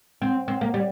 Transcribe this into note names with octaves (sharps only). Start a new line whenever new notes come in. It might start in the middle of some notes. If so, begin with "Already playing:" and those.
C4
C4
A#3
G3